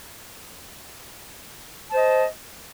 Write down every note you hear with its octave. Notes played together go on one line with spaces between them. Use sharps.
C5 D#5 A5